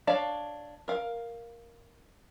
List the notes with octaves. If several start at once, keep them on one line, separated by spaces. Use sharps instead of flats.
D4 C#5 D5 F5 A5
A#4 F5